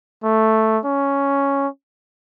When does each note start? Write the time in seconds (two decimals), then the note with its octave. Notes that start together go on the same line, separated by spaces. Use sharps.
0.24 A3
0.85 C#4